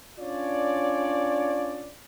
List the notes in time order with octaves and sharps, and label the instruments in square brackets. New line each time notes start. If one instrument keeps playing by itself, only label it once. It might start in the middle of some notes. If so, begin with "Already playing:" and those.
[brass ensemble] C#4 D4 F4 C#5 D5